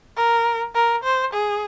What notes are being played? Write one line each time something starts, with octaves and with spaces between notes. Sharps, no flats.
A#4
A#4
C5
G#4